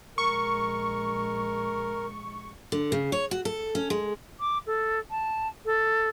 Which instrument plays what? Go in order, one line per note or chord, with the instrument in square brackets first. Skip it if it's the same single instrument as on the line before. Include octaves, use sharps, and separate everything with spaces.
[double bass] A#1 G#3 [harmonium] A#4 [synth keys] C#6
[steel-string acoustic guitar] D3
C#3
C#5
F#4
A4
C#4
G#3
[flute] D6
A4
A5
A4